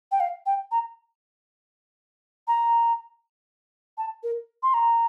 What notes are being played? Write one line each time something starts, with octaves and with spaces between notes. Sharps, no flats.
G5
F5
G5
A#5
A#5
A5
A#4
C6
A#5